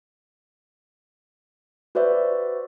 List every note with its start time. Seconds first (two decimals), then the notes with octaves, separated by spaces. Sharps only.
1.95 F#4 B4 C5 D5 E5